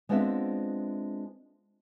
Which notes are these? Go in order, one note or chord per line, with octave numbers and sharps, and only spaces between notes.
G#3 B3 C4 D4 F4 E5